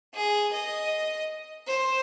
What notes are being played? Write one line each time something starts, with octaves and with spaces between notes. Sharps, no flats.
G#4
D#5
C5